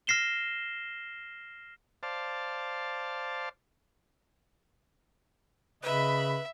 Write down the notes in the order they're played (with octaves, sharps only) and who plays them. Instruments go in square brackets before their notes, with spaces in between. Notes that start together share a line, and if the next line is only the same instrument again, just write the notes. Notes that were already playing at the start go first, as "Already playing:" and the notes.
[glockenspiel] F6 A#6 C7 E7 G7
[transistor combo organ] C5 D5 F5 A5
[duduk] C#3 [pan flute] B4 [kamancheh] D#5 B5 [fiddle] E5